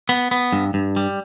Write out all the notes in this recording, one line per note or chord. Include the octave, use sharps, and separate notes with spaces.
B3
B3
G2
G2
G3